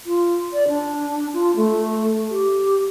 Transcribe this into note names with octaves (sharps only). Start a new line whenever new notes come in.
F4
D5
D4
F4
A3
G4